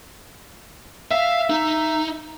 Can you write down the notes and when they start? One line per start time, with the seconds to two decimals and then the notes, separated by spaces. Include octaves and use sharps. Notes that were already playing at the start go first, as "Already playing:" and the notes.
1.11 E5 F5
1.50 D#4